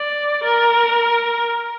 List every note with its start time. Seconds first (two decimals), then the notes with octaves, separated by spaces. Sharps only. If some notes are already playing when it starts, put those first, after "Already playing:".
Already playing: D5
0.44 A#4